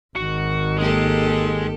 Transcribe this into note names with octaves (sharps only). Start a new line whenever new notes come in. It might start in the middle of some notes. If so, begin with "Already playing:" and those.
G#1 D#3 F#4
G#3 A#3 G4 A4